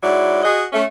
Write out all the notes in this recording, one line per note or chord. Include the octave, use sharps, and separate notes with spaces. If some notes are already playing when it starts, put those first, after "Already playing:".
G#2 F#3 E4 D5
F#4 G#4 D#5
A3 C#4